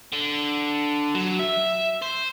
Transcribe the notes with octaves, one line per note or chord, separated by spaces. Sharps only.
D3
F#3
E5
C5